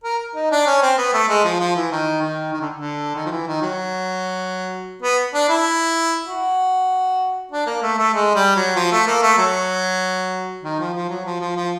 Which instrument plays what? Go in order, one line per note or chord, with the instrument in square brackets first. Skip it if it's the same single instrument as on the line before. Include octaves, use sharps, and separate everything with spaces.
[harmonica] A#4
D#4
D4
C#4
C4
B3
A3
G#3
F3
F3
E3
D#3
D#3
D#3
D3
D3
D#3
F3
E3
D#3
F#3
B3
D4
E4
F#4
D4
A#3
A3
A3
G#3
G3
F#3
F3
A3
A#3
A3
F#3
D#3
F3
F3
F#3
F3
F3
F3